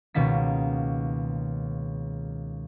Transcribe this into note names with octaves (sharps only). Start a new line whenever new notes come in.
C#2 B2 D#3 A#3 B6